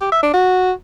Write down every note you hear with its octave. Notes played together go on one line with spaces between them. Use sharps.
G4
E5
D4
F#4